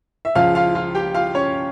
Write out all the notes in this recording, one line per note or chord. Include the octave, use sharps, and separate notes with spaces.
E5
C#2 C#3 F3 F4 F5
F4 F5
F4 F5
G4 G5
F4 F5
C#4 C#5